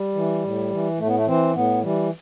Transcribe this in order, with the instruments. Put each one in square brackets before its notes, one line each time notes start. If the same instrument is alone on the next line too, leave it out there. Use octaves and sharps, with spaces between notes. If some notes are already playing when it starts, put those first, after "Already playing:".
Already playing: [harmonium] G3
E3
A2
E3
A2 A3
B3
A3
E3 C4
A2 B3
E3 G3